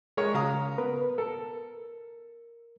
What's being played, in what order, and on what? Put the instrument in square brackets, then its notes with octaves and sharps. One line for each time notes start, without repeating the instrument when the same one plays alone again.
[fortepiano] G#3 A#4 C#5
[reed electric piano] C#3 [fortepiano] F5 A#5 D#6
[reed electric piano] B3 A#4 B4
[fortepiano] A4 [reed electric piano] A#4